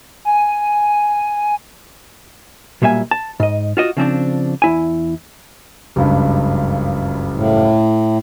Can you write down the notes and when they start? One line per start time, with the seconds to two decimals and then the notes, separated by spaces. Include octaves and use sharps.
0.25 G#5
2.82 B1 A#2 G3 E5 G#5
3.11 A5
3.40 G#2 D#5
3.77 F4 F#4 D#5
3.97 C#3 F3 C4 D4
4.62 E2 E4 G#5
5.96 F#1 C#2 G2
7.32 A2